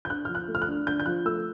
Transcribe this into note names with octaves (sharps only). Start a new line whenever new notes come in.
G6
D4 F#6
F3 F6
F#6
A3
F6
F#6
D4
D4 G6
G6
F3 F#6
A3 E6